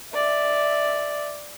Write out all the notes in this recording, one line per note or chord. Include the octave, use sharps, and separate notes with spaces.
D5 E5